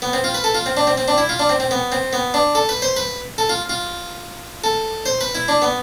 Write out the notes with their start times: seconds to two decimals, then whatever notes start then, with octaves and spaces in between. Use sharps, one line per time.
0.02 B3
0.13 C4
0.24 F4
0.35 B4
0.44 A4
0.55 F4
0.66 C4
0.77 D4
0.87 C4
0.98 C4
1.08 D4
1.18 E4
1.29 F4
1.39 D4
1.49 C4
1.60 C4
1.71 B3
1.92 C4
2.13 B3
2.34 D4
2.55 A4
2.69 B4
2.82 C5
2.97 B4
3.38 A4
3.49 F4
3.69 F4
4.64 A4
5.06 C5
5.21 B4
5.35 E4
5.48 D4
5.62 B3